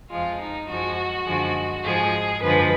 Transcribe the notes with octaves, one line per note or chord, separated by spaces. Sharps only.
F2 F3 G#3 F4
D#4
F#2 F3 G#3 F#4
F#2 D3 F3 G#3
G#2 F3 G#3 G#4
F#2 D3 F3 G#3 B4